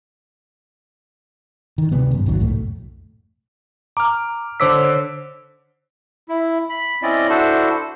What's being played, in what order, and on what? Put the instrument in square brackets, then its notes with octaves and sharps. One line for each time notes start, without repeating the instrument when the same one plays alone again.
[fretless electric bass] D#3
D2 C3 G3 B3
G#1 F#2
A1 D2 D#3 F#3
B1 F2 A2 A3
[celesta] A#5 [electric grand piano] D6 F6
[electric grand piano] D3 D6 B6 [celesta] C5 C#5 E6
[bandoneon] E4
B5
C4 C#4 E4 D5 D#5
D4 E4 F#4 A4 C5